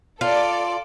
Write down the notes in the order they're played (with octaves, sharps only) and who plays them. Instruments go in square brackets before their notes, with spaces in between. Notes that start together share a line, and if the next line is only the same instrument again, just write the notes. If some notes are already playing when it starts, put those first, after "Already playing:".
[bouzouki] F4 [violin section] A4 D5